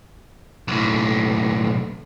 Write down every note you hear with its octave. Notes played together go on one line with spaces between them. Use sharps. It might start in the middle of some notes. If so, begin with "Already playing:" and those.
B1 A2